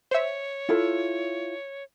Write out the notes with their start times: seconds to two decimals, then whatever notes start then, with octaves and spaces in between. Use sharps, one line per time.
0.11 C5 C#5 E5
0.69 E4 F4 A4